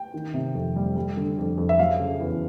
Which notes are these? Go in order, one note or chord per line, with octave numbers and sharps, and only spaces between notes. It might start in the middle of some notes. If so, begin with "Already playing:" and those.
Already playing: G5
D#3
C3
F2
G3
G3
D3
F2
F2
E5
F#3 F5
C#3
E2